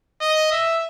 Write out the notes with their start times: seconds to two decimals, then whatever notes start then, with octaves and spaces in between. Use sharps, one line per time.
0.21 D#5
0.51 E5